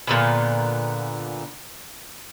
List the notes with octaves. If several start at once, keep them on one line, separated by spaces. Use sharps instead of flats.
A#2 D3 B3